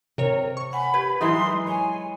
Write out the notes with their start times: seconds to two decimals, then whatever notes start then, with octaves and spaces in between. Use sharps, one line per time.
0.18 C3 A#4 C#5
0.57 C#6
0.73 F#5 G#5 B5
0.94 G4 B4 G#6
1.21 E3 F#3 G#3 D#4 C6
1.67 C#5 G#5